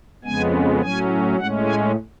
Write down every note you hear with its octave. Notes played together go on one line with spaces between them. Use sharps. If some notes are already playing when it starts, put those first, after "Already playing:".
F2 C#3 G#3 B3 G#5
A2 F#3 C#4 G#5
A2 G#3 C#4 F#5
G#5